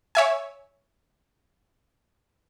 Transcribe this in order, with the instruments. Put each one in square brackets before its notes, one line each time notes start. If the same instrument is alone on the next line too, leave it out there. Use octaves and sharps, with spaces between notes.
[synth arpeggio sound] C#5 E5 G#5